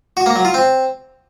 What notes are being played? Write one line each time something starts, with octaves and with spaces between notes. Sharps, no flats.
F#4
A#3
F#3
F4
C4